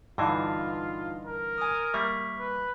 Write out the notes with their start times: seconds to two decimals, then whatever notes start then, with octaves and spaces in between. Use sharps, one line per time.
0.18 G2 D3 E3 D#4 F4 D#5 F5
1.25 A#4
1.58 G#5 D#6
1.94 G3 A#3 E5 C#6
2.40 B4